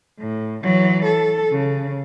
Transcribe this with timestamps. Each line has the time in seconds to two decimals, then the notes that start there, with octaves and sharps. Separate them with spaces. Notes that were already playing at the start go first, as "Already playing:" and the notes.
0.19 A2
0.62 E3 F#3
1.05 A4
1.51 C#3